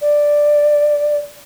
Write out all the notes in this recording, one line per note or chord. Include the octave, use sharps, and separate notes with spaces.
D5